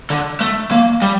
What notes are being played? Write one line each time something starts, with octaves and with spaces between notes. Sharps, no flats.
D3
A3
A#3
G3